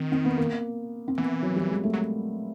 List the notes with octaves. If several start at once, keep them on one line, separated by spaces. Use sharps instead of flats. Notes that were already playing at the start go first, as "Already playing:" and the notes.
Already playing: D#3 C4
C4
B3
A#3
C4
E3 B3
F#3
G3
G#3
A3
F#3